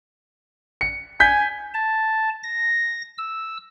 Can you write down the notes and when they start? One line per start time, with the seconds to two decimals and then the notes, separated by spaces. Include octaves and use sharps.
0.81 C#7
1.20 G#5 G6 B6
1.74 A5
2.43 A#6
3.18 E6